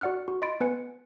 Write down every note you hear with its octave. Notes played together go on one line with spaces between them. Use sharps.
F#4 D5 F#5 F6 F#6
F#4
D#5 B5 C6 A6 D7
B3 B4 G#5 C#7